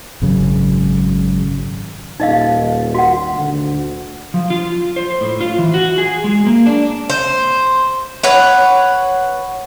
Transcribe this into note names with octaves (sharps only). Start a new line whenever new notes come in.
G#1 F#2 C#3
D#1 D#4 D#5 F5
F#4 F#5
D2
F3
F4
C5
A2
F4
E3
F#4
G#4
G#3
A#3
D4
C5
B4 C#5 F#5